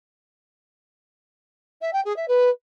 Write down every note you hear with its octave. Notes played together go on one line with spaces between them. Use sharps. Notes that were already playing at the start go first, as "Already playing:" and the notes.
E5
G5
G#4
E5
B4